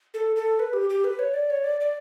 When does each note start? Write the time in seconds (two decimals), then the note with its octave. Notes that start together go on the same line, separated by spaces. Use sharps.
0.14 A4
0.36 A4
0.59 B4
0.73 G4
0.90 G4
1.04 B4
1.19 C#5
1.34 D5
1.50 C#5
1.64 D5
1.80 D5